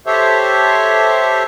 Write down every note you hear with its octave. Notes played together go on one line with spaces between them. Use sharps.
G4 A4 C5 C#5 E5